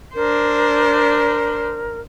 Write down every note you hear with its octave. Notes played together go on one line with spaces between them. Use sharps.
D4 A#4 C5